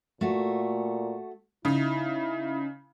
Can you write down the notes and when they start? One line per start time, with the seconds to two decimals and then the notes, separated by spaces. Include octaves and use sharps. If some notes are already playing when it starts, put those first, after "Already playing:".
0.21 A#2 A3 F#4
1.65 C#3 D#4 E4